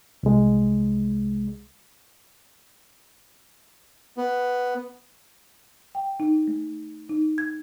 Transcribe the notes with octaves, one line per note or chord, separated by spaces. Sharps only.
C2 G#3
B3
G5
D#4
A3
D#4
G#6